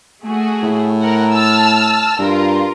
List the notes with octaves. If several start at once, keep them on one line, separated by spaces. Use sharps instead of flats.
A3 F#4 G#4
A2
A#4 F#5
A5 E6 F6
G2 F4 A#4